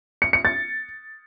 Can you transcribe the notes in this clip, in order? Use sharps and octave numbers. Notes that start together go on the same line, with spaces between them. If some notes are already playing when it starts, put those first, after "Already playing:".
C#7
C#7
A6